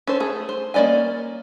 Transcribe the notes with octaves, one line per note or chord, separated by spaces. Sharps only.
C#4 A4 C5
A3 G#4
C5
A#3 C#4 D5 D#5 G#5